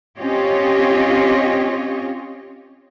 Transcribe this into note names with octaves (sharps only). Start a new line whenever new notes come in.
C4 C#4 F4 G4 C#5 D#5